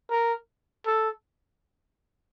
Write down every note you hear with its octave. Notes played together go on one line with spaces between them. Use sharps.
A#4
A4